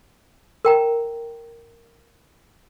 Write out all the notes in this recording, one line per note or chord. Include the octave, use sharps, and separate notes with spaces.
A#4 G5 A#5